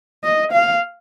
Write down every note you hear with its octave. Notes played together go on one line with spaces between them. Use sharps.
D#5
F5